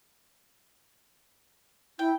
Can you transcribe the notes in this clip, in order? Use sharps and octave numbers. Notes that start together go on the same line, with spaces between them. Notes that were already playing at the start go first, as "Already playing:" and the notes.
E4 G5